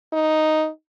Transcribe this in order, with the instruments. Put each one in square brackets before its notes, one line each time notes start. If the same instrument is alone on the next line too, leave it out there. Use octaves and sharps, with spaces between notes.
[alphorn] D#4